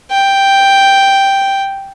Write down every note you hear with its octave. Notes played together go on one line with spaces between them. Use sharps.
G5